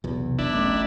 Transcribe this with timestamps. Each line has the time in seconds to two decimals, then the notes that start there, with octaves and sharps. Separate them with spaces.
0.04 B1 E2 C3
0.39 F#1 D4 E4
0.53 A3 C#4